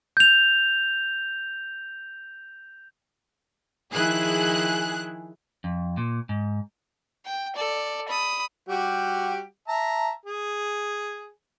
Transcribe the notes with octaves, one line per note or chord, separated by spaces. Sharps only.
G6 F7
D#3 F3 E4 G#4 F#6
F2
A#2
G#2
G5
A4 D5
B5 D#6
G3 F#4 G4
E5 A5 A#5
G#4